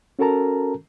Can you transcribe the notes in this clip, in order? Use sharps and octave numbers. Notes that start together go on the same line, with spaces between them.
C#4 F#4 A4 A#4 A5 A#5